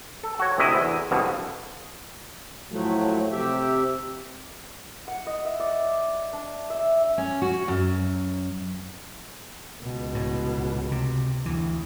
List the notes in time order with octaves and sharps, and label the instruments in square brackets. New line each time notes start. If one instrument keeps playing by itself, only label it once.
[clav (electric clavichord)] A4
F#4 C#5
D2 C3 E4 D#5
E2
C2 F2 B2 D3
[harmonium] A2 F3 F#3 A3
C3 G4 E5
[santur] F#5
D#5
E5
D5
D4
E5
[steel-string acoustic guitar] C#4
F#4
F#2
[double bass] C#2 B2
[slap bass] A2
C3
D2 E3